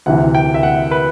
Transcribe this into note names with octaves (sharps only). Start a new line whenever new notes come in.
D2 C3 E3 F#5
G5
E5
F#5
B4